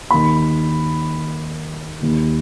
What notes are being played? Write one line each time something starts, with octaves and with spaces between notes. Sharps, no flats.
D#2 D#3 B5
D#2 D#3